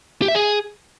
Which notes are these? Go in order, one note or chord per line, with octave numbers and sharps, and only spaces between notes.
G4
E5
G#4